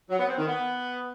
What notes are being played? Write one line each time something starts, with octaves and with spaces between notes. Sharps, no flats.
F#3
B3
C4
D#3
B3